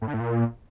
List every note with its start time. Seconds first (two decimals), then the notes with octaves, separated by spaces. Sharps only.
0.02 A2
0.08 D3
0.14 A2
0.20 A#2